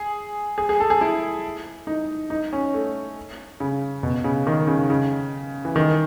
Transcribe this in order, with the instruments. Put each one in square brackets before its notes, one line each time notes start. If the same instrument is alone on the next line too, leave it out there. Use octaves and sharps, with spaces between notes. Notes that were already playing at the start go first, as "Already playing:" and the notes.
Already playing: [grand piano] G#4
G#4
G#4
A4
G#4
E4
D#4
D#4
C#4
A3
C#3
B2
C#3
D#3
C#3
C#3
E3
D#3